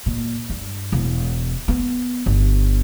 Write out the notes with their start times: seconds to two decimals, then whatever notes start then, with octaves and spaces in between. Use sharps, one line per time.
0.06 A#2
0.50 G2
0.92 E1
1.68 B3
2.26 G1